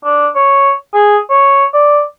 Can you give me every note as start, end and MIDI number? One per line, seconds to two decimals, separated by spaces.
0.04 0.28 62
0.35 0.73 73
0.94 1.17 68
1.30 1.65 73
1.74 2.03 74